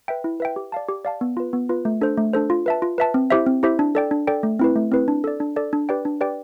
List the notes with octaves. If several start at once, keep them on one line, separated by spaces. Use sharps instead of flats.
B4 E5 G5
E4
B4 E5 G5
G4
D5 F5 A5
G4
D5 F5 A5
B3
F4 B4
B3
F4 B4
A3
D4 A4 C5
A3
D4 A4 C5
F4
B4 E5 A5
F4
B4 E5 A5
C4
E4 G4 C5 E5
C4
E4 G4 C5 E5
D4
A4 D5 G5
D4
A4 D5 G5
A3
C4 E4 B4
A3
C4 E4 B4
D4
A4 D5
D4
A4 D5
D4
G4 B4 D5 G5
D4
G4 B4 D5 G5